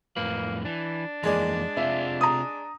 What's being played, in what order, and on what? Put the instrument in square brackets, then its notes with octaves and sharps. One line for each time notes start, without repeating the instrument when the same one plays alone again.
[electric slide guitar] F2 A2 B4 [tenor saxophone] A#3
[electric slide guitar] E3 [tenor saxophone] D4
[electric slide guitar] F2 E3 A#3 [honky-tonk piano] G#3 G#4 D5
[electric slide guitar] C3 F4 [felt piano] E5
[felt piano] A#5 D#6